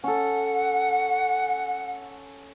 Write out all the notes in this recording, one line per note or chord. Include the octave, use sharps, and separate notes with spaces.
C#4 A4 F#5